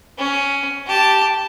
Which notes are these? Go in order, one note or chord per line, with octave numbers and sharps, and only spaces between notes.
C#4
G4 A5